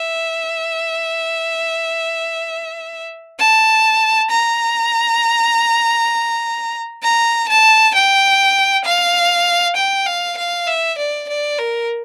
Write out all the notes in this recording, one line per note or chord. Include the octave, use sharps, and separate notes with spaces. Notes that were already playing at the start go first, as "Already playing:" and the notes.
Already playing: E5
A5
A#5
A#5
A5
G5
F5
G5
F5
F5
E5
D5
D5
A#4